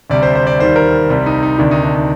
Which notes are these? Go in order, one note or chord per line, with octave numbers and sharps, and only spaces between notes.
D2 C3 G3 D5
C5
C5
D5
D#2 D#3 G3 C5
A#4
C2 C3 G3
D#4
D#4
D2 C3 D#3 D4
D#4
D4
D#4